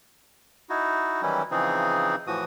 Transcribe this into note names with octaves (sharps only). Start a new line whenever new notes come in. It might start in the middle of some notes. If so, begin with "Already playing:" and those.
D#4 E4 F#4
D#3 E3 F#3 G3 C#4 E4
C#3 E3 F3 C4 D#4 G#4
A2 E3 F3 F#4 D#6